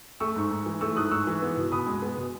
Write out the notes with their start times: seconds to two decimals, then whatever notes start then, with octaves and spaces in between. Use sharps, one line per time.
0.20 A3 C#6 E6
0.36 G#2
0.51 G#2
0.66 E3
0.81 A3 C#6 E6
0.96 G#2 D#6 F#6
1.11 G#2 C#6 E6
1.27 E3
1.42 B3
1.57 B2
1.72 B2 B5 D#6
1.87 G#3
2.02 B3
2.18 B2